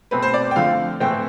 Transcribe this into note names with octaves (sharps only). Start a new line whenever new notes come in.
B2 A3 C4 B4
C5
D5
G5
D3 F3 A3 C4 F5
A2 E3 A3 C4 G5